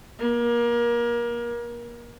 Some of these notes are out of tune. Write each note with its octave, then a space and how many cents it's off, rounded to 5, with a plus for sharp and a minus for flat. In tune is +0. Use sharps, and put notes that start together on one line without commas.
A#3 +30